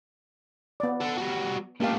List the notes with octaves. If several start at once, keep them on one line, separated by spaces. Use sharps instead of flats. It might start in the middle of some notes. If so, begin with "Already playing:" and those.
B3 D5
A4 F#5
G3 F#4
C#2 A3 A#3 G4 F5